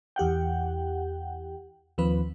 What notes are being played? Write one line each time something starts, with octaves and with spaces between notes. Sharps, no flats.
E2 G4 F#5 G5
D#2 F3 C4 B4